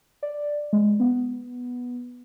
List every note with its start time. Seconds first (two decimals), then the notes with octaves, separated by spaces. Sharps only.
0.23 D5
0.73 G#3
1.00 B3